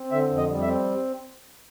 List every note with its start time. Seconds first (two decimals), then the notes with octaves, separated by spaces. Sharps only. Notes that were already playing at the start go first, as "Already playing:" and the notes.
Already playing: C4
0.11 D3 E5
0.30 F2
0.37 D#5
0.50 G3
0.62 E5
0.68 C4